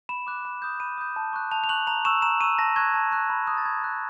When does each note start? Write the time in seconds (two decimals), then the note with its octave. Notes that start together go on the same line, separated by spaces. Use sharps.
0.09 B5 E7
0.27 D6 F#6
0.45 B5
0.62 D#6 G6
0.80 B5 D#7
0.98 D#6 G6
1.16 A5
1.33 C#6 F#6
1.51 A5 F7
1.64 F7
1.69 C#6 F#6 F#7
1.87 A#5 F7
2.05 C#6 E6 E7
2.22 A#5 E7
2.41 C#6 E6 D#7
2.59 A5 A#6
2.76 C#6 F#6 G#6
2.94 A5
3.12 C#6 F#6
3.30 B5
3.47 D#6 F#6
3.57 A6
3.65 B5 G#6
3.83 D#6 F#6